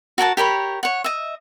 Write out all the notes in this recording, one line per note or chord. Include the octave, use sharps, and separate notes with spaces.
F#4 A#4 G#5 A5
G4 A#4 C#5 B5
C#5 F#5
D#5 E5